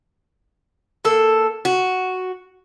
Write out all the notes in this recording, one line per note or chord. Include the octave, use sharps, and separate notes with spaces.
A#3 A4
F#4